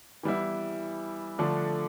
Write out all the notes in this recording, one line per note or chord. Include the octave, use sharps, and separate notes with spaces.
E3 G3 B3 E4
D3 F3 A3 D4